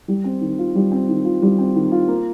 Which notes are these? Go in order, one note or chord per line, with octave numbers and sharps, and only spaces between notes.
G3
C4
D#3
F4
G3
C4
D#3
F4
G3
C4
D#3
F4
A#3